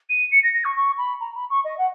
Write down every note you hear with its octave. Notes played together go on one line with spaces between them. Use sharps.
D#7
C#7
A#6
A#6
C#6
C#6
B5
A#5
B5
C#6
D#5
F#5